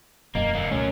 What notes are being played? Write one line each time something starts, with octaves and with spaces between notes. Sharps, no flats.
E1 F#2 A#3 D#5 G5
D3 A#3
C#2 B2 A3 C#4 A#4